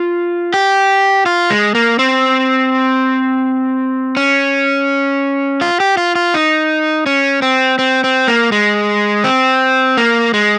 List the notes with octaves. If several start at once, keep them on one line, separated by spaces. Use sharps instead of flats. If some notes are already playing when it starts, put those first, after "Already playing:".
Already playing: F4
G4
F4
G#3
A#3
C4
C#4
F4
G4
F4
F4
D#4
C#4
C4
C4
C4
A#3
G#3
C4
A#3
G#3